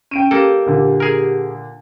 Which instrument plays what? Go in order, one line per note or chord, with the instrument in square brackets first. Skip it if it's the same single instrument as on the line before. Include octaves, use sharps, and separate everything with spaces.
[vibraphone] C#4 [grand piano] G5 D7 D#7
[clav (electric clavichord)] A#3 A4 [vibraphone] G4
[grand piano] A#2 D3
[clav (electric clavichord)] G#4 A#4